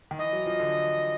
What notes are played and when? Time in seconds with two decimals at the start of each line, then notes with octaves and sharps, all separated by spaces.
0.11 D#3
0.19 E3 D#5
0.33 F#3
0.46 F3
0.59 D3